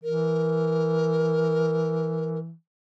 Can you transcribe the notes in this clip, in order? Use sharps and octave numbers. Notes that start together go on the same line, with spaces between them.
E3 A#4